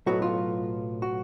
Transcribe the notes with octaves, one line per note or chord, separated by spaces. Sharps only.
B1 A2 F#3 B3 F#4
F4
F#4